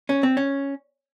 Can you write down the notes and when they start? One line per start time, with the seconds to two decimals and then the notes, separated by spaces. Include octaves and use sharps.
0.09 C#4
0.23 C4
0.37 C#4